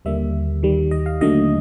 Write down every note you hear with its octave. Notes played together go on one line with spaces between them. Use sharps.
D#2 D3 G3 A#3 E5
D#2 D#3 G3
D#5
F5
D#2 D3 F#3 A3 D#5